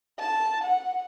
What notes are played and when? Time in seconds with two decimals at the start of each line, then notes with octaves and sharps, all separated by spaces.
0.19 A5
0.64 F#5